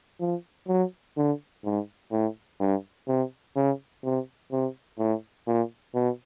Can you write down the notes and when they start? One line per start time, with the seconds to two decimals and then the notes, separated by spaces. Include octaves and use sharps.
0.20 F3
0.68 F#3
1.17 D3
1.64 G#2
2.12 A2
2.60 G2
3.08 C3
3.56 C#3
4.04 C3
4.52 C3
4.99 A2
5.47 A#2
5.94 B2